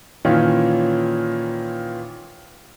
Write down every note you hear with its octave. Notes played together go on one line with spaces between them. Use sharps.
A#2 D#3 E3 C#4 F4